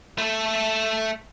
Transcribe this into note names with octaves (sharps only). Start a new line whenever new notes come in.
A3 A4